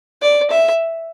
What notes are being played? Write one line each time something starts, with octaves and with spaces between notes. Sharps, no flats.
D5
E5